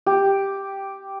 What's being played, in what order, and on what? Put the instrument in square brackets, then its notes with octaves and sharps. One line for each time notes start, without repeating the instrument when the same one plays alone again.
[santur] G4